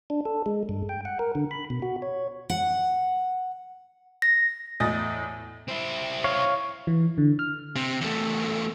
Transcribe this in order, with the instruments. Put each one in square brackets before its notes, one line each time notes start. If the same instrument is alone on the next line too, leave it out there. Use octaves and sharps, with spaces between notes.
[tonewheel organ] D4
A4
G#3
G2
G5
F#5
A#4
D3
B5
B2
F#4
C#5
[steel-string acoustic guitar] F#5
[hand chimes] A#6
[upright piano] E2 A2 D#5 D#6 A6 A#6
[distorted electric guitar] C4 E4
[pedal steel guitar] C#5 F5
[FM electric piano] E3
D3
F6
[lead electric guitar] C3
E2 A3